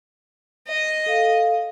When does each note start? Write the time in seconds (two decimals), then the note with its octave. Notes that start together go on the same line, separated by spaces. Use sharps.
0.68 D#5
1.06 A4 F5